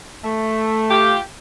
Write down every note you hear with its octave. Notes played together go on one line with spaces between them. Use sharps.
A3
F4 G4